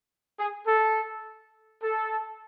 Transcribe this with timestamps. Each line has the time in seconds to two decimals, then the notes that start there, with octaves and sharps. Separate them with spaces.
0.39 G#4
0.67 A4
1.83 A4